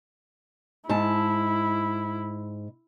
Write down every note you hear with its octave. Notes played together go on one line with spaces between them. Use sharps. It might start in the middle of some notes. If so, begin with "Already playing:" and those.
G#2 E4 A5